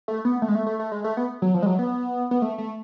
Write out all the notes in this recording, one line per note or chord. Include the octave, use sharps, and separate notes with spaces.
A3
B3
A3
G#3
A3
A3
A3
G#3
A3
B3
F#3
F3
G#3
F#3
B3
B3
A3
A3